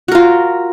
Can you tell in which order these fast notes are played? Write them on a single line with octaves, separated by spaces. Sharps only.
F#4 A#4 F4